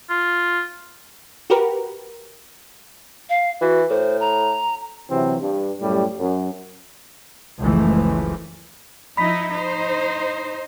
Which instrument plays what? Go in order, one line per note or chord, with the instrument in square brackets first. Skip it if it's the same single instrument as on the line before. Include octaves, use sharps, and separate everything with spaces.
[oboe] F4
[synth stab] F#4 G4 A#4 B4
[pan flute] F5
[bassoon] E3 [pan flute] F#4
[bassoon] A2 [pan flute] C5
[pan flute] A#5
[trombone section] C3 E3 F#3 C4
G2
F#2 A2 G3
F#2
[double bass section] F#1 C#2 E3 F3 A3
[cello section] F3 D#4 E4 [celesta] B5 B6
[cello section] D#4 C5